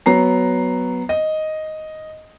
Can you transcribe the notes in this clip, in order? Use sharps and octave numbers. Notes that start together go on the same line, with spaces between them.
F#3 B3 A#5 C7
D#5